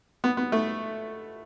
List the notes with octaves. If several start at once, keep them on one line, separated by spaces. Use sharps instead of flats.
B3
B3
A3